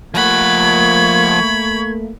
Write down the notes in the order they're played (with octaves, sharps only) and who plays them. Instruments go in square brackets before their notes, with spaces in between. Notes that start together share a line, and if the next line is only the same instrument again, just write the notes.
[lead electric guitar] F3 F#5 [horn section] A3 A#3 [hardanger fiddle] B5 [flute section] C#6 G#6